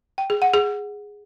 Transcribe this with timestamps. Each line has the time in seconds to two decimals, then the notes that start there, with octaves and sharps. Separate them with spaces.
0.18 G5
0.30 G#4
0.42 F#5
0.54 G#4